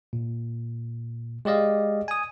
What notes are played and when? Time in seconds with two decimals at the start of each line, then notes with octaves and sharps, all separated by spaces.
0.13 A#2
1.45 G#3 G4 D5 D#5 F5
2.08 G#5 D#6